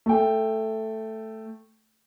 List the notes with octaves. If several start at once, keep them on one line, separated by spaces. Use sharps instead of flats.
A3 G5